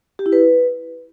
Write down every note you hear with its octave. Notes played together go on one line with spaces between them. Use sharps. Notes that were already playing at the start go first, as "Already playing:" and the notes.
G4
E4
B4